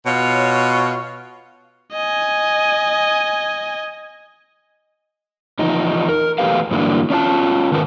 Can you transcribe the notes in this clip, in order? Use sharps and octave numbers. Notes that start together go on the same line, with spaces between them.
B2 F4 C#5
D#5 G#5
E2 F3 D#4
A#4
E2 G#3 A3 G4 B4 F5
G2 D3 E3 F#3 A#3 D4
C#4 D4 F4 A5
G#2 D#3 A#4 B4 A5